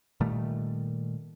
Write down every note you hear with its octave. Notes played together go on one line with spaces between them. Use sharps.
A#2 D#3 G3 A3